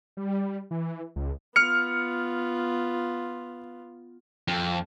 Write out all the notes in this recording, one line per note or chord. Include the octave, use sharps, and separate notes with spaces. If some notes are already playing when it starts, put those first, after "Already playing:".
G3
E3
C#2
B3 F4 F6 C#7
F2